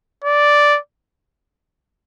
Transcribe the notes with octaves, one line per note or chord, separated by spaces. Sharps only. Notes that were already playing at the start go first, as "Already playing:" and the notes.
D5